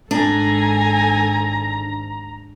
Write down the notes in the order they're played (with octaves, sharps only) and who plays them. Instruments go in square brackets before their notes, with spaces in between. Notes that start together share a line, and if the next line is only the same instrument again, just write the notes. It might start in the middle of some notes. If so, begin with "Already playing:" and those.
[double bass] G#1 G#2 [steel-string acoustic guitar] D4 [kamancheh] A4 G#5 [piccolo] A#5